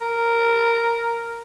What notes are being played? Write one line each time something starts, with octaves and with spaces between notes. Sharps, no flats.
A#4